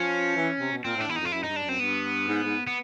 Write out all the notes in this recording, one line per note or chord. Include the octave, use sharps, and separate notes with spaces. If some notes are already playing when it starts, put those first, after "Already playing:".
Already playing: F3 C#4
E3
C3
B2
A#2 C4
A2 D4
E2 E4
D#4
F2 F4
F#2 E4
G2 D#4
D4
F#2
C4
G2 B3
G#2
G#2
B3